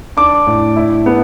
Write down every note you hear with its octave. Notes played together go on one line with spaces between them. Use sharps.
D4 D6
A2
E4
B3